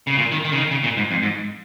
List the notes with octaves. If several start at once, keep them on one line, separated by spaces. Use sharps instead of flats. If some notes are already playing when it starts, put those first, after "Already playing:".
C#3
A#2
D#3
D#3
C#3
D#3
C#3
A#2
G#2
F2
G#2